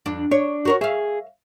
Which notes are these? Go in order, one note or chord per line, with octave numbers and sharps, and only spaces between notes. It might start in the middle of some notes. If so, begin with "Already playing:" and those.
F2 D4
D4 C#5
F#4 A#4 C#5
G#4 E5 F5